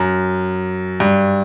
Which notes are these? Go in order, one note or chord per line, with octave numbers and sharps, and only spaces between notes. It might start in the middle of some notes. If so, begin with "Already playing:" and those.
Already playing: F#2
G2